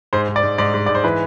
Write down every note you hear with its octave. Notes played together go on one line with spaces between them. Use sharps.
G#2 C5
G#2
D5
G#2
G#2 D5
G#2
G#2 D5
C5
E3 B4